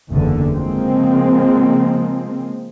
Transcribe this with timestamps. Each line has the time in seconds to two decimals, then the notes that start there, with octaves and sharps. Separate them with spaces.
0.11 F#1 E2 D3
0.54 C#3 F3 G#3 A#3 C4